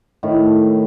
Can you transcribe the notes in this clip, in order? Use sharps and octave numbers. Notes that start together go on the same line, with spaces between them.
A2 D#3